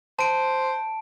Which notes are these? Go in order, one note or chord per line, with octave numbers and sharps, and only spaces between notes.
C5 A5 D7